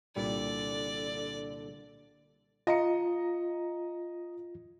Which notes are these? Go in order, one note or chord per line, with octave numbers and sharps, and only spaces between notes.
C2 A#2 D3 G3 D5
F4 D#5 A#5 C#7